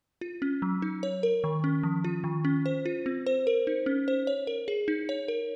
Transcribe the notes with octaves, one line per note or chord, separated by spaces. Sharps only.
F4
C#4
F#3
D#4
C#5
A#4
D#3
C#4
F3
F4
D#3
C#4
C5
F4
C4
C5
A#4
D#4
C#4
C5
C#5
A#4
G#4
D#4
C#5
A#4